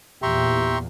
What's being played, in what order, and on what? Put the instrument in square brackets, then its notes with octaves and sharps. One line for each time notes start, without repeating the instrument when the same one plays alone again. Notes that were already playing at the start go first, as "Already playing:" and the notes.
[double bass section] E2 A#2 [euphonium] G4 [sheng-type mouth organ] E5 G5 [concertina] A#5 C6 C#6